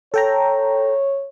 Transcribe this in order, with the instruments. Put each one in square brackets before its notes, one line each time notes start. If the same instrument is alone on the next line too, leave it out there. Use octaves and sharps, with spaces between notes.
[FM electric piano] A4 G5 A#5 [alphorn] C#5